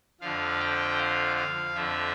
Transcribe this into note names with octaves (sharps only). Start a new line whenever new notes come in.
F2 D3 F3 F5
G5
F5
F5
F2 D3 F3 E5